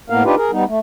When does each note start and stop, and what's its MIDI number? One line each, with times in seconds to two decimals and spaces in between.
0.10 0.23 45
0.10 0.23 58
0.10 0.23 59
0.10 0.23 70
0.10 0.23 77
0.24 0.35 62
0.24 0.35 63
0.24 0.35 65
0.24 0.35 67
0.24 0.35 71
0.36 0.51 68
0.36 0.51 70
0.51 0.65 55
0.51 0.65 59
0.51 0.65 63
0.68 0.79 57